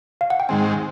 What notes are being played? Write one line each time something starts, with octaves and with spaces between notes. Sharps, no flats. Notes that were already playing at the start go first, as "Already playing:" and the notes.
F5
F#5
G5
G#2 D#3 G#3 C4 G#5